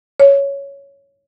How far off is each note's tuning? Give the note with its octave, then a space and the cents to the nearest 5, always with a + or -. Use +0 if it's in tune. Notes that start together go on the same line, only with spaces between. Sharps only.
C#5 +5